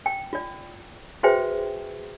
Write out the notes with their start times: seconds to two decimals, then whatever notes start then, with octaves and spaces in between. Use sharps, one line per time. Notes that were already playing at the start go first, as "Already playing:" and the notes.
0.06 G5
0.33 F4 D5
1.23 F#4 G#4 B4 C5 E5 G5